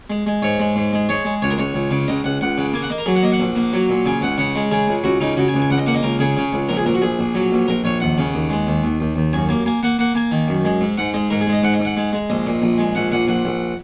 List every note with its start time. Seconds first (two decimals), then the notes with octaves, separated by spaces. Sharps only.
0.10 G#3
0.26 G#3
0.42 G#2 C#5
0.60 G#3
0.76 G#2
0.93 G#3
1.09 G#3 C#5
1.25 G#3
1.42 C#2 C#5
1.50 A#4
1.58 C#2 C#5
1.74 C#2
1.91 C#3
2.08 C#2 D#5
2.24 C#2 F#5
2.41 C#2 F#5
2.58 C#3
2.73 A#3 G#5
2.82 F#5
2.90 A#3 D#5
2.98 A#4
3.06 F#3 G#4
3.15 F#5
3.23 A#3 D#5
3.32 F#5
3.40 A#1
3.56 A#3
3.73 F#3
3.89 A#2
4.06 C#3 G#5
4.21 C#2 F#5
4.38 C#3 F#5
4.55 G#3
4.71 C#3 G#4
4.88 C#2
5.04 C#2 F#4
5.21 C#3 D#4
5.37 C#3 F#4
5.48 G#5
5.54 C#2
5.60 G#5
5.70 C#2 F#5
5.78 D#5
5.86 A#3 F#5
5.95 D#5
6.03 C#2 A#4
6.19 C#3 G#4
6.37 C#3
6.53 C#2
6.69 A#1 A#4
6.77 G#4
6.85 A#1 A#4
6.94 F#4
7.01 A#1 G#4
7.19 A#1
7.35 F#3
7.52 A#1
7.68 A#1 A#4
7.84 A#1 C#5
8.00 D#2 F#5
8.18 C#3
8.34 D#2
8.50 G#3
8.67 D#2
8.83 D#2
9.00 D#2
9.16 D#2
9.33 F#2 G#5
9.49 A#3 G#5
9.66 A#3 G#5
9.83 A#3 F#5
9.99 A#3 F#5
10.15 A#3 G#5
10.31 D#3
10.48 F#2
10.65 G#3
10.81 G#2
10.97 G#2 F#5
11.14 G#3 D#5
11.30 G#2 A#4
11.41 G#4
11.47 G#3
11.53 D#5
11.63 G#2 F#5
11.74 D#5
11.80 G#2
11.85 F#5
11.97 G#3
12.13 G#3
12.30 A#1 D#5
12.46 A#2
12.62 A#1
12.78 G#3
12.95 A#1 F#5
13.12 A#2 F#5
13.28 A#1 F#5
13.45 A#1